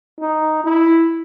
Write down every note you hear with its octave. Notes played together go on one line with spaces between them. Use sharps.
D#4
E4